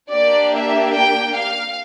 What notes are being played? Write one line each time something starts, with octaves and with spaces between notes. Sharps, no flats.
A#3 D4 G4 D5
E5
G5
F5